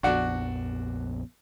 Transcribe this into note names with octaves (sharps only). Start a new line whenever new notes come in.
A#1 F2 B3 D4 F#4